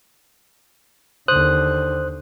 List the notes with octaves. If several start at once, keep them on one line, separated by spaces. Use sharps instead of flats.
D#2 D3 C5 D#6 F#6